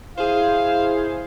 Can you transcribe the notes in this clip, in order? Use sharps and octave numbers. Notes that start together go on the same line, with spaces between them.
E4 G#4 C5 F5